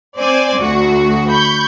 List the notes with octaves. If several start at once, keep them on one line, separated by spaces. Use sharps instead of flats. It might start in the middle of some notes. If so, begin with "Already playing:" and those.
C4 C5 D5 G#5
D2 F#4
B5 C#6 G6